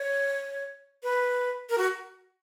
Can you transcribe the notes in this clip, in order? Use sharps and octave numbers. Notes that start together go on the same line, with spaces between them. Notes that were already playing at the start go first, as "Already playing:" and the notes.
Already playing: C#5
B4
A#4
F#4